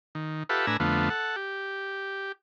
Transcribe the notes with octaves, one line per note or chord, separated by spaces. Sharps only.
D#3
F4 G4 A4 B4 E5 F#5
A2 D4 B4 G#5 A#5 E6
F2 D3 A3 B3 F4
A4 F#5
G4